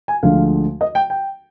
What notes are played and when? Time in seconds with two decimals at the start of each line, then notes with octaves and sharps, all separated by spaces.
0.08 G#5
0.23 D2 D3 F3 G#3 F5
0.81 D#5
0.95 G5
1.10 G5